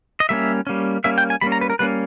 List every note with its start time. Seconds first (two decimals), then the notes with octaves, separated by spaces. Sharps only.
0.20 D#5
0.29 G3 A#3 C#4 E5
0.67 G3 A#3 C#4
1.04 G3 A#3 C#4 E5
1.18 G5
1.30 G#5
1.41 G3 A#3 C#4 B5
1.52 A#5
1.61 B4
1.70 A#4
1.79 G3 A#3 C#4 B4